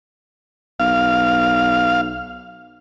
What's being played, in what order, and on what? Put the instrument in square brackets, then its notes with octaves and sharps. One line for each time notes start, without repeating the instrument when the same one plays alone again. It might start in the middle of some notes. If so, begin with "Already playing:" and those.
[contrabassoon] B1 [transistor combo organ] F5